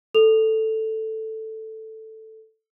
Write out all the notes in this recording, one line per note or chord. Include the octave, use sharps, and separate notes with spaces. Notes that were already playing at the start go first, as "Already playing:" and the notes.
A4 F7